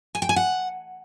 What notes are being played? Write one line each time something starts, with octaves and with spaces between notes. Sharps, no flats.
G#5
G5
G#5
F#5